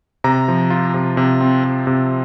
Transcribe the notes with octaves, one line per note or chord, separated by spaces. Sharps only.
C3 A#5
F3
F4
C3
C3
C4
C3
C3